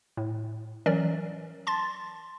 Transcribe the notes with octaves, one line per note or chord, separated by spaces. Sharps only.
A2
E3 F#3 C#4 A#4 D5
A5 C6 A6